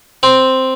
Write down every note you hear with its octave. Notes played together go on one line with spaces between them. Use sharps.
C4